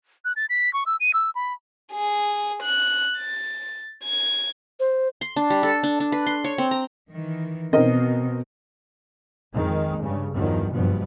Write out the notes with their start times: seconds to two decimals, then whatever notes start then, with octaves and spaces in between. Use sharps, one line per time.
0.25 F#6
0.36 A6
0.50 B6
0.73 C#6
0.86 E6
1.00 D#7
1.14 E6
1.35 B5
1.93 G#4
2.63 F#6
3.18 A6
4.04 G#6
4.80 C5
5.21 C6
5.36 D4
5.50 G3
5.63 A4
5.84 D4
6.00 D4
6.12 B4
6.26 C6
6.44 C#5
6.58 C4
6.71 A#5
7.11 D#3 E3
7.73 B2 C4 A#4 D#5
9.53 F2 D#3 G#3
10.02 G2 C#3
10.35 E2 G2 D#3 F3 F#3
10.71 F#1 G2 B2 F3 B3